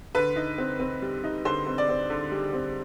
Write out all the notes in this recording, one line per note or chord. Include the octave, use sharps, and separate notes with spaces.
D3 B4
D#4
C4
C4
G3
D#4
D3 C5
C4
D5
C4
D3
G3
C4